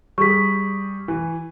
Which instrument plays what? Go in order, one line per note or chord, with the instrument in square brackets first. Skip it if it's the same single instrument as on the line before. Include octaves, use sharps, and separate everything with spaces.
[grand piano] G3 G#4 [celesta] C#6 B6
[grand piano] E3